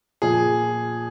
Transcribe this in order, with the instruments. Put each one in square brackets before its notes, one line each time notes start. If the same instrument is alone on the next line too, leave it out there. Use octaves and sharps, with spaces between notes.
[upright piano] A#2 F3 G#4